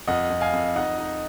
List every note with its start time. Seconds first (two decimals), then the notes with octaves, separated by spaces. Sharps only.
0.08 F2 D#5 F#5
0.30 F2
0.41 F5 G#5
0.53 F2
0.76 D#4 D#5 F#5
0.98 D#4